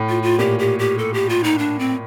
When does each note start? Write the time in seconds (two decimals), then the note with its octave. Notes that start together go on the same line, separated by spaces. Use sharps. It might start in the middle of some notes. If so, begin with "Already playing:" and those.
Already playing: A2
0.09 F4
0.23 F4
0.38 A#2 G4
0.59 G4
0.79 G4
0.98 A4
1.14 G4
1.29 F4
1.44 D#4
1.58 D4
1.79 C4